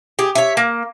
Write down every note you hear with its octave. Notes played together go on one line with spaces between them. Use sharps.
G4 G#4
C#5 E5
A#3